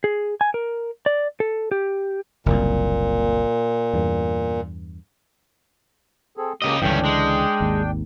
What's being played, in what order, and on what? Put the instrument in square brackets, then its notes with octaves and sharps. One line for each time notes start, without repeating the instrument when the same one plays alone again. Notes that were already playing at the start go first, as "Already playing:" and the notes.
[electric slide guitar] G#4
G#5
A#4
D5
A4
G4
[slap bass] F#1 C2 [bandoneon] A#2
[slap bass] E2 G2
[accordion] C4 G#4 A4
[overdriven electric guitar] C#3 D#5 [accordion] G#3 A#3 G4
[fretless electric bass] C#2 D3 E3 [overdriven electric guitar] G2 C#4 [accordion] D4 G5
[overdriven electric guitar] G#3
[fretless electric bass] G#1 D#2